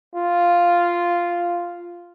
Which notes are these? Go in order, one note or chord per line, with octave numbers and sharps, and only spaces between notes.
F4